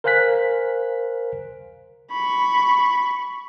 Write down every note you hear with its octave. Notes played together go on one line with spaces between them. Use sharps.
A#4 C5 F5 G#5 F#6 B6
B5 C#6